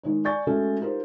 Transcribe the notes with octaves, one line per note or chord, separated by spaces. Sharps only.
D#3 G#3 D#4 C#5
D5 G#5 C#6 G6 A6
G#3 A3 C#4 F#4 G#4 A4
D#4 F4 G4 A#4 C5